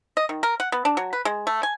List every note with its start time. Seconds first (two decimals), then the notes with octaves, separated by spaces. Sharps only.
0.17 D#5
0.29 D#3
0.43 A#4
0.60 F#5
0.72 B3
0.85 D4
0.97 F#3
1.13 B4
1.25 G#3
1.47 A3
1.63 G#5